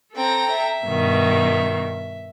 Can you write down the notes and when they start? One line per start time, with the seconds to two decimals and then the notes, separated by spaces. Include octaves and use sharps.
0.15 C4 A4 G5 A#5
0.51 E5
0.84 G2 B2 D#3